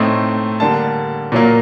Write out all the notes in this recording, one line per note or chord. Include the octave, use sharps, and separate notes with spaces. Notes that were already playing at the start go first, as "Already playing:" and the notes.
Already playing: A2 A3 C4 D#4
D3 G3 A#3 A5
A#2 F#3 A#3